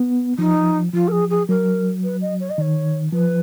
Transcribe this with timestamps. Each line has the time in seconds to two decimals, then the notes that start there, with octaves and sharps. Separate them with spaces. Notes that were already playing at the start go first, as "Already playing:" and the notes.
Already playing: B3
0.38 F3 D#4
0.93 F3 F4
1.08 A#4
1.12 G#4
1.30 G#4
1.48 F#3 A#4
2.03 B4
2.21 D#5
2.40 C#5
2.50 D#5
2.58 D#3 C#5
3.13 F3 B4